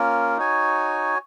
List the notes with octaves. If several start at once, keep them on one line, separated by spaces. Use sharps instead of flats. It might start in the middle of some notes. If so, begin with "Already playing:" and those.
Already playing: A#3 C#4 F4 A#4
D#4 F#4 C#5 G#5